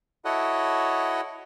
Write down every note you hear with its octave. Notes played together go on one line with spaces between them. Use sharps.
E4 F#4 A4 C#5 D#5 F#5